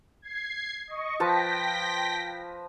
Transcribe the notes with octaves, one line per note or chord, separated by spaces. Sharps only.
G#6 C7
D#5 C#6
F3 B4 G5 A5 A#6 B6